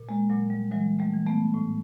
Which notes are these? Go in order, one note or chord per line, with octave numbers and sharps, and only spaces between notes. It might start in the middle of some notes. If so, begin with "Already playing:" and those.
Already playing: A#2
G#3 A#3
A#2 F#3
G3
E3 F#3 G#3
G3 A3
E3
A3 B3
A2